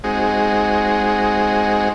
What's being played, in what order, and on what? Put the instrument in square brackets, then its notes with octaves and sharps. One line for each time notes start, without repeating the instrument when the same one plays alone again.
[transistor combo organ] G#3 C4 D#4 F#4 G#4